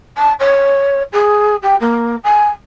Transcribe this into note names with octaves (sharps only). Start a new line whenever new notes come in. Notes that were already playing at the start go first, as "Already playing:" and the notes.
A5
C#5
G#4
G4
A#3
G#5